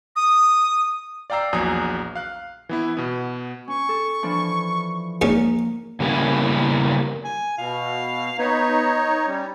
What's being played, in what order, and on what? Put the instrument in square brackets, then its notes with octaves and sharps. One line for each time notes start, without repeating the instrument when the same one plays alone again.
[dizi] D#6
[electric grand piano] D5 F5 G5 A#5 E6 C7
A#1 E2 F#3 G#5 A#5 D#6
F5 F#6
E3 B3 E4
B2 B3
[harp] C#4 [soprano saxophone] C#6
[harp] A4
E3 F3 D4
[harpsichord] G#2 C#4 [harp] A#3
[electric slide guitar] C#3 G3 A#3 B3 C#4 E4
[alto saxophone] G#5
[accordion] B2 [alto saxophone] F5
[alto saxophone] B3 [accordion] D#4 C#5
[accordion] G3 [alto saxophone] C#4